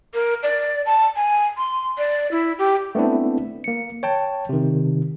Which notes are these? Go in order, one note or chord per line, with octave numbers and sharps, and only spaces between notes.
A#4
D5
A5
G#5
C6
D5
E4
G4
A3 B3 C4 D4 E4
A#3 C#7
C#5 G5 A5
C3 D#3